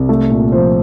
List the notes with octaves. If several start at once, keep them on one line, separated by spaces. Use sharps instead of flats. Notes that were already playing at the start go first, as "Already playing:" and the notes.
Already playing: C2
A3
A#2
F3 C5